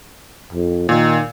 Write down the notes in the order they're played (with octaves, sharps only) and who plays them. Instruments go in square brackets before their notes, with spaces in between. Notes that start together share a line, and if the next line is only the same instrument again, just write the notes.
[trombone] F2
[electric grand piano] A#2 [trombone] D#3